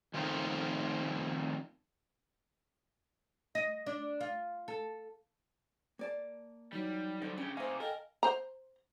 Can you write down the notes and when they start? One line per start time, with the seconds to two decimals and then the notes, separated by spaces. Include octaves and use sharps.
0.14 D#3 F3 A3 C4 D#4 F4
3.55 D#5
3.86 D4
4.21 F4
4.68 A4
5.99 A#3 D5 A5
6.73 E3 F#3 G3 D#4
7.22 G#2 D3 G3
7.38 C#3 C#4 D4 G4
7.57 C3 A3 D#4 C5 F5 G#5 D6
7.80 A4 A#4 D#5 G5
8.23 C5 A#5